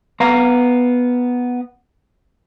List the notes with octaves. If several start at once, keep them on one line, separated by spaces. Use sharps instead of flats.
B3 F5 A#5